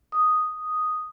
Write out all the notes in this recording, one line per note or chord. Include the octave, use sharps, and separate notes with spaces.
D#6